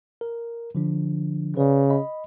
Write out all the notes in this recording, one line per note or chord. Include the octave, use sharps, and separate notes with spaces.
A#4
D3 F3 D4
C#3 B4 D5
D#5 B5